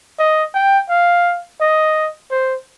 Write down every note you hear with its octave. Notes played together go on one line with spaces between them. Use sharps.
D#5
G5
F5
D#5
C5